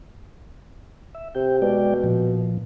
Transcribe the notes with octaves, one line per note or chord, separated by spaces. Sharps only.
E5
C3 G5
B2 G#3 D5 G5
A#2 F3